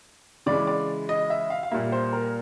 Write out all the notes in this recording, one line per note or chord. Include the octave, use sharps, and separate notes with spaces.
C#3 E3 G#3 D5
D5
D#5
E5
F5
F5
A#2 G3 A#3 E5
C5
A#4